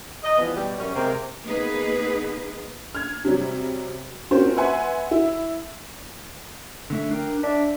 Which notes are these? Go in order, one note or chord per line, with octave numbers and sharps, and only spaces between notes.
D#5
E3 F3 G3 B3
B2 G3
F#2 C#4
C3 G#3 A#3
A#3 B3 D#4 G#4 B4
F6 G#6
C3 F#3 G3
A#3 C4 C#4 F4 F#4 C5
B4 E5 F#5 G#5 C6
E4
D3 A3 E5
D4 A#4 G5
D4 E5